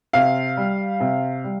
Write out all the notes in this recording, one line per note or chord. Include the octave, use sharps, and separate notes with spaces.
C3 F5
G3
C3
G3